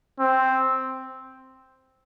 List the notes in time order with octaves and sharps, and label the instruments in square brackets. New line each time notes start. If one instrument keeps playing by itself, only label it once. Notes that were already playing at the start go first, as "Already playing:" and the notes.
[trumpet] C4